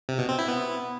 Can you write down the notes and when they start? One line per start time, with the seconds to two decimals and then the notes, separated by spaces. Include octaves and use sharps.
0.09 C3
0.19 B2
0.29 C4
0.39 E4
0.48 B3